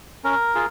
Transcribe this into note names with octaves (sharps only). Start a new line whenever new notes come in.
C#4 A#4
F4 G#4